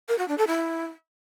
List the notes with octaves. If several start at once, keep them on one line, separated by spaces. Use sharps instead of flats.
A#4
F#4
D4
A4
E4